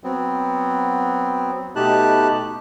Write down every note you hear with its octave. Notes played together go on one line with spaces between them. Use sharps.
F#3 B3 C4
B2 A3 D#4 G4 A5 F#6